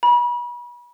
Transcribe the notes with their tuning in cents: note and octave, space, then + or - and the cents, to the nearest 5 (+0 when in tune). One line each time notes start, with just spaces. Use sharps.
B5 -35